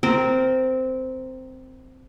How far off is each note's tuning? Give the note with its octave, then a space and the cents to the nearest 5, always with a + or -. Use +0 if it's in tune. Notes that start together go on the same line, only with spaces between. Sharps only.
C4 -10 A#4 +0